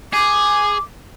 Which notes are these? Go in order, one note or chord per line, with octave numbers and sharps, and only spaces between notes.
G#4 D6